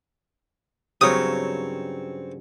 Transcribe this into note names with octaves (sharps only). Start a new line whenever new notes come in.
G2 C#3 F#3 C4 C#5 D#6